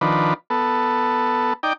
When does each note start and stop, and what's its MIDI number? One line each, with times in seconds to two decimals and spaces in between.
0.01 0.34 51
0.01 0.34 53
0.01 0.34 62
0.01 0.34 71
0.50 1.53 59
0.50 1.53 69
1.63 1.73 63
1.63 1.73 74
1.63 1.73 79